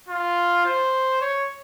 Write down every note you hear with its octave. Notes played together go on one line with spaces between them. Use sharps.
F4
C5
C#5